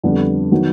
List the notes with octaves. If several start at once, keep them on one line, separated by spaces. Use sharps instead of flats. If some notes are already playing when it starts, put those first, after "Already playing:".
F2 D3 G3 B3 D4
D#3 F#3 B3